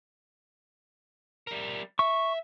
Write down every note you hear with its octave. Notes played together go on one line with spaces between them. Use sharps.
G3 A#4
E5 C#6